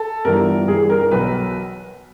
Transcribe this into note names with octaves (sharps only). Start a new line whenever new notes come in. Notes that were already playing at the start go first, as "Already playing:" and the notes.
Already playing: A4
G1 G2 E3 G3 A#4
G1 G2 E3 G3 G#4
A#4
A#4
B1 B2 F#3 B3 B4